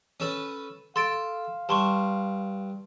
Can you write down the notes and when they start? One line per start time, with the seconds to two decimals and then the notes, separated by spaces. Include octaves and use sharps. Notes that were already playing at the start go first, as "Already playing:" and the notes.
0.20 C#4 A4 B4
0.96 A4 F5 C6 A6 D7
1.69 G2 A5 C6 C#6